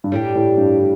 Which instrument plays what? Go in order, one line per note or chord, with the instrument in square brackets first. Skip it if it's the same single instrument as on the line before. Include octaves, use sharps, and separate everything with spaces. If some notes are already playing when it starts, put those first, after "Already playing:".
[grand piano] G2
[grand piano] A2 [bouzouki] G3 D4 G4
[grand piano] A2
G2
A2